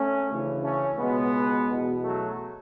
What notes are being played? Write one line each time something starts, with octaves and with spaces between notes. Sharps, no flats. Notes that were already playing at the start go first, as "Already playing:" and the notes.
Already playing: A3 C#4
D2 C#3 E3
A3 C#4
C#2 B2 G#3 B3
E2 B2
F#3 A3